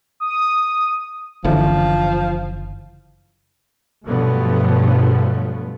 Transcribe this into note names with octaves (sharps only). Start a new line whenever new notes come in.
D#6
F#1 D3 E3 F3
G2 B2 F3 F#3 A3 B3